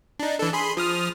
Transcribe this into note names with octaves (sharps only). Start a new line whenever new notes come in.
D4 D#4
E3 D4 A4
G#4 B5 C6
F3 D#6 F6